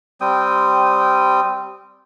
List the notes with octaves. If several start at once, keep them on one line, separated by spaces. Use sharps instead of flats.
G3 C4 G5 D#6